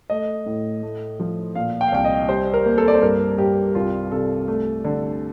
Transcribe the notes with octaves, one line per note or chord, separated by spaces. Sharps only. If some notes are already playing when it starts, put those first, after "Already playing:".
A3 D#5
A2
A3
F3
A#2 F5
G5
F5
C2 G5
D#5
G3 C5
A#4
A#3
A4
D5
C5
G2 A#4
G2 G4
C2 F4
C3 A4
A3
D3